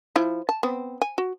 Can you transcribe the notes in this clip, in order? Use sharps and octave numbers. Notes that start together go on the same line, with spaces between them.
F3 E4
A5
B3 C4
G#5
F#4